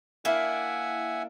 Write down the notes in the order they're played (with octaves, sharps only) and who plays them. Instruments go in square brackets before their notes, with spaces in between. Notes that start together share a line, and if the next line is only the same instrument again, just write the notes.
[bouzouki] A#3 D4 E4 [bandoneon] E5 F#5 G#5